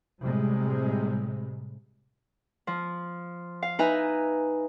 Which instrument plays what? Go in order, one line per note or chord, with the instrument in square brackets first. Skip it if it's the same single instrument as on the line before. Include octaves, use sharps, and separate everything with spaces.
[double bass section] A2 C3 G3 G#3
[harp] F3
F5
D#4 B4 E5 G#5 A#5